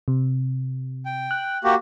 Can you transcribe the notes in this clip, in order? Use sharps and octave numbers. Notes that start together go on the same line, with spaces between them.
C3
G5
F#6
A#3 F#4 G4